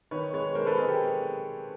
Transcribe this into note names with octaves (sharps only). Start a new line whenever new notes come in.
D#3 B4 C#5
G#3 B4 C#5
G#3 A#4 C5
A4 B4
G#3 G#4 A#4
G4 A4